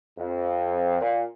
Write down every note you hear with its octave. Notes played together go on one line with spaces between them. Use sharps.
F2
A#2